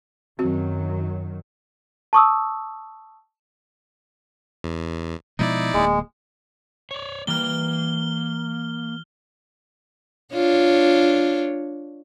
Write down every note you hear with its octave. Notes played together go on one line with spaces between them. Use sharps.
F#2 D#3 F#3 C4 F#4
A5 C#6 D#6 E6
E2
B2 F3 G#3 D#4 E4 D5
D1 G#3 A#3
C#5 D5
E3 G3 A#3 F6 G7
D4 F4 C#5